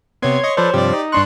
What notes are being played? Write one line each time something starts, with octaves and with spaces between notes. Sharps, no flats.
C3 B3 C#5 C6 G#6
D#5 C#6
F3 A4 B4 C5 D5
G2 C3 F3 G4 D5
D#4
G2 D4 C6 C#6 F#6